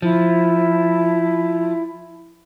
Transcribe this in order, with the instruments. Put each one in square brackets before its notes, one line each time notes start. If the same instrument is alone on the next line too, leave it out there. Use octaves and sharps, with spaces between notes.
[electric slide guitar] F3 [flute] E4